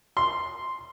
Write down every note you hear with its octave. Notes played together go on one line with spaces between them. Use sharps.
C6